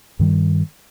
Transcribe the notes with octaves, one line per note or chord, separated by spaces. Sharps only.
G2 D#3 G3